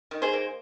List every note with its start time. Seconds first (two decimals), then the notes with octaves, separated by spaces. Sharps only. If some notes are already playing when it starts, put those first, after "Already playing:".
0.11 D#3
0.22 G#4 C5
0.33 A#3